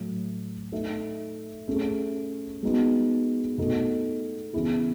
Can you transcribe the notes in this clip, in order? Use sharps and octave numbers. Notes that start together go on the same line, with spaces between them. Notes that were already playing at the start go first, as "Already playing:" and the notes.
Already playing: A2 F#3 A3
A3 D#4 A4 E5
A3 C#4 G#4
G#3 B3 D#4 F#4
B2 A3 D#4 A4
C#3 E3 B3 E4 G#4